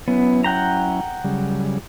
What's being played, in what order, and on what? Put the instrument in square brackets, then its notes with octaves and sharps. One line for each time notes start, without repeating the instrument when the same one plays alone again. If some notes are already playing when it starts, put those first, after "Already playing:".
[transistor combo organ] F#3 C#4 E4 [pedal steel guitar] B3
[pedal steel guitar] F#5 G5 A#5
[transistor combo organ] C#3 F#3 G3